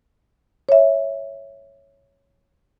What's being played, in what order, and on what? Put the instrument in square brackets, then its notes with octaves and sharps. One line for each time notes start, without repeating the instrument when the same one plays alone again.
[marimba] C#5 E5